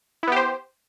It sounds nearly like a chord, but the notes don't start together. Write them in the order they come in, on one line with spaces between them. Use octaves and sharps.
E4 B3 G4 C5